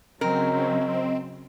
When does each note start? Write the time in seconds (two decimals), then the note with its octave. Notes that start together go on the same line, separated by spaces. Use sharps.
0.21 C#3 F#3 C4 A#4 D#5